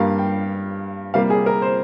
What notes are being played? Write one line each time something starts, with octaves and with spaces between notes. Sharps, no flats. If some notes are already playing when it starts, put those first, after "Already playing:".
Already playing: G2 G3 A#3 F5
G5
C3 G3 A#3 F5
G#4
A#4
C5